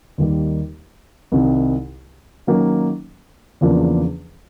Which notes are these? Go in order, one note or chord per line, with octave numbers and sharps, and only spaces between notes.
D#2 D#3 G3 A#3
C2 C3 D#3
D#3 F#3 A#3 C#4
E2 C#3 F3 A#3 D4